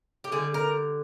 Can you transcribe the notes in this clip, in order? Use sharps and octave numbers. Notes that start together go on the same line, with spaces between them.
G4
D3 G3 G#4
A#4